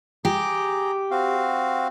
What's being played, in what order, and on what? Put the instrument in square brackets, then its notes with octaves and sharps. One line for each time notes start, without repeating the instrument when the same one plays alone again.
[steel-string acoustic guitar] G4 [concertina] G#4 A#5
[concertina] C4 F#4 F5